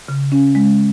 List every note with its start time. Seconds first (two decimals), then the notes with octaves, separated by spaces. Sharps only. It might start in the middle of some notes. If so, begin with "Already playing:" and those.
0.08 C#3
0.32 C#4
0.55 G#3